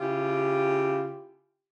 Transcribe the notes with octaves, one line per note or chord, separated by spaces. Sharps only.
C#3 E4 F4 G4